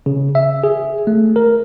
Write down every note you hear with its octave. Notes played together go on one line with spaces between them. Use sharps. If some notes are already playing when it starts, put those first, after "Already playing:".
C#3
E5
G#4
A3
A#4